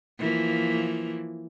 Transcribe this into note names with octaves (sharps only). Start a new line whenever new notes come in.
E3 F3 A#3